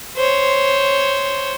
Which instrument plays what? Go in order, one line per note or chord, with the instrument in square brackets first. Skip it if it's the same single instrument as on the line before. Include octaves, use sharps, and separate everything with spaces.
[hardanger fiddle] C5 C#5